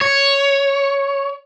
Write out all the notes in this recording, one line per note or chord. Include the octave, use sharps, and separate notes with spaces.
C#5